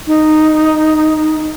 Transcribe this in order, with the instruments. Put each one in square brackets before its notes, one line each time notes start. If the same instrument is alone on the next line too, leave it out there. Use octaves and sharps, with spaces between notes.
[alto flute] D#4